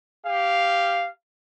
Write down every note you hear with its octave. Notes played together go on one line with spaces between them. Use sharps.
G4 F5